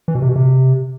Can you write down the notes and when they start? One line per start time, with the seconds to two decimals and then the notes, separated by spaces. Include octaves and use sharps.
0.08 E3
0.15 B2
0.22 C3
0.29 B2
0.36 C3